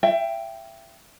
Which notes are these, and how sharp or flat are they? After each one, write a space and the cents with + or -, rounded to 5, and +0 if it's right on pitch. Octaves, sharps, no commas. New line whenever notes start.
E5 +30 G5 +0